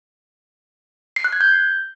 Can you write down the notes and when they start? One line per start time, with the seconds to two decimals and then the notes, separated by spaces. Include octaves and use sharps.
1.16 C7
1.24 F#6
1.33 G#6
1.41 G6